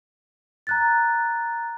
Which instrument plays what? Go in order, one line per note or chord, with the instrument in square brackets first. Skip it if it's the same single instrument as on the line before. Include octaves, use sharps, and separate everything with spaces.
[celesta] A#5 F#6 A6